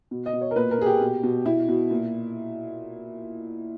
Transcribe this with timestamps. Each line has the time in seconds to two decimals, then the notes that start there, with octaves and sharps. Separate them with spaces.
0.11 B2
0.26 D#5
0.33 B2
0.41 C#5
0.51 A#4
0.56 A#2 B4
0.71 A#4
0.78 A#2 G#4
0.86 G4
1.01 B2
1.23 B2
1.46 B2 E4
1.69 B2
1.91 A#2